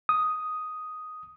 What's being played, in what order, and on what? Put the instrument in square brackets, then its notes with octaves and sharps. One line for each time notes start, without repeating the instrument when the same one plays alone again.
[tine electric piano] D#6